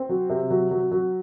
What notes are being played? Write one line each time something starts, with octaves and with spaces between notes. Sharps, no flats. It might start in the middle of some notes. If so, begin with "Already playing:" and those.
Already playing: C4
F#3
C3
F#3
F#3
F#3